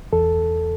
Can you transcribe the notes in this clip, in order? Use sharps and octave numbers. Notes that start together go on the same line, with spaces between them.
E2 A4